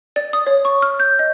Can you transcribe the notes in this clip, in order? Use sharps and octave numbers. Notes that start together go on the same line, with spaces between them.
D5
D#6
C#5
C#6
F6
G6
D#5